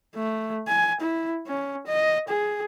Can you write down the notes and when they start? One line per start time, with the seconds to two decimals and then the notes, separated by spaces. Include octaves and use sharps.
0.16 A3
0.68 G#5
1.01 E4
1.47 C#4
1.87 D#5
2.29 G#4